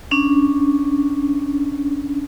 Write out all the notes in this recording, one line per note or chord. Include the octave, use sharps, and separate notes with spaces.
C#4 D4